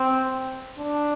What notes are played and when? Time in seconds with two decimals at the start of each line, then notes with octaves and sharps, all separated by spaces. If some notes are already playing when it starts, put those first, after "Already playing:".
Already playing: C4
0.79 D4